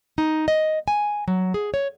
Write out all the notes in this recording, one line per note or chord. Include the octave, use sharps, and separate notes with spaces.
D#4
D#5
G#5
F#3
G#4
C#5